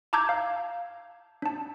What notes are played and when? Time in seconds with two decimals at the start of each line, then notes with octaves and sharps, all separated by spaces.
0.13 A5 A#5 D6 E6 G6 G#6
0.29 F5
1.42 D4 A5